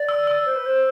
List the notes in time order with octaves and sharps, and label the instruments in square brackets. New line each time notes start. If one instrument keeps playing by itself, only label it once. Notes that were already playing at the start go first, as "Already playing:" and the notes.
Already playing: [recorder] D5
[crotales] E6
E6
[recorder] C5
B4
C5